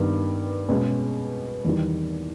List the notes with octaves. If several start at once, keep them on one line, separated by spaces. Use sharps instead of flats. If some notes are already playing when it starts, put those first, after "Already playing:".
Already playing: G2 D#3 G3 B3
B2 G#3 C#4 G#4
E2 D#3 G3